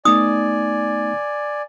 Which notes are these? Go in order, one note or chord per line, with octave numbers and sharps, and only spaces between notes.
A3 B3 D#4 D5 G#5 D#6